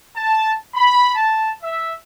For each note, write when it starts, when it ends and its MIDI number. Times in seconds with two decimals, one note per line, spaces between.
0.16 0.52 81
0.74 1.12 83
1.15 1.50 81
1.62 1.92 76